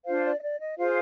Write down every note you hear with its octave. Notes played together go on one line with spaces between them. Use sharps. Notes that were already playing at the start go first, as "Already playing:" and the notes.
D4 F4 C5 F5
D5
D#5
D5
D#5
F4 G#4 C5 F5